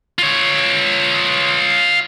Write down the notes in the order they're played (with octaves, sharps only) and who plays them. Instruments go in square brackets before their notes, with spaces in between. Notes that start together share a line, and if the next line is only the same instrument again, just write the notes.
[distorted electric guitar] F4 C#5